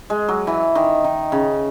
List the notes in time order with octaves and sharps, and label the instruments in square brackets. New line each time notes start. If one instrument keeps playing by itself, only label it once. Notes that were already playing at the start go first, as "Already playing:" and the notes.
[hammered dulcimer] G#3
F#3
E3
D#3
D#3
C#3